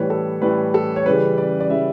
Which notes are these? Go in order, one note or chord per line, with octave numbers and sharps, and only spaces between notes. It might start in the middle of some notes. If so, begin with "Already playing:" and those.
Already playing: A2 E3 G3 B4 C#5
A4
A2 E3 G3 B4
A4
C#5
C#3 E3 G3 B4
D5
D5
C#3 E3 G3 E5